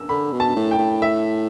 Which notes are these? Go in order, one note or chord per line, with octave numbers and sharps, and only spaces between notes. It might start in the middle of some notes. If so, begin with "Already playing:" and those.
Already playing: E6
D3 B5
B2
A5
A2
G5
A2
E5